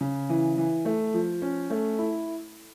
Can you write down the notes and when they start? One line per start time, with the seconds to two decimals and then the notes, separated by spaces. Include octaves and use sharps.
0.01 C#3
0.29 E3
0.58 E3
0.85 A3
1.14 F3
1.42 C#4
1.70 A3
1.98 E4